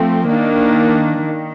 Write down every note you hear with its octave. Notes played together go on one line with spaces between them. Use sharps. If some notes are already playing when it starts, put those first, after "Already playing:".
Already playing: F3 A3 C4
D#3 A#3 D4
D#3